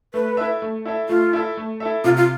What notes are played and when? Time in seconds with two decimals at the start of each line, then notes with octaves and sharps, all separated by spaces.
0.14 A3 B4
0.37 E4 A4 E5
0.62 A3
0.85 E4 A4 E5
1.09 A3 F4
1.33 E4 A4 E5
1.57 A3
1.80 E4 A4 E5
2.04 C3 F4
2.17 F4